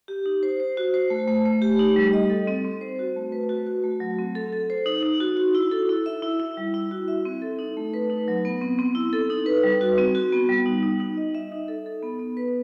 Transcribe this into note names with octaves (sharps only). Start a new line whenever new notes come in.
G4
D#4
C5
C5
F#4
C5
A3
A3
A3
G4
D#4
G3
D#5
A4
C4
C4
C5
F#4
A3
B4
F#4
F#4
A3
F#3
C4
A4
A4
C5
D#4
D#4
F#4
F#4
E4
A4
E4
E5
E4
E4
G3
E4
F#4
E5
C4
A4
D#4
A3
B4
D#4
F#3
B3
C4
C4
E4
A4
D#4
B4
G3
F#4
C4
F#4
B3
G3
D#4
D#4
D#4
D#5
E5
D#4
A4
A4
B3
B3
B4